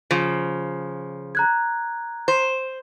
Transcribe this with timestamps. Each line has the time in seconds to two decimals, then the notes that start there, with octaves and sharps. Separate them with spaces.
0.11 C#3 F3
1.35 A#5 F#6 G#6
2.28 C5